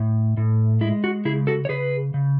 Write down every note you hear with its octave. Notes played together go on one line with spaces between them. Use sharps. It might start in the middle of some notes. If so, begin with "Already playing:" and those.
Already playing: A2
A2
G#3 E4
F#4
C#3 E4 G#4
F#4 A4
C#5
C#3 G#4 B4
C#3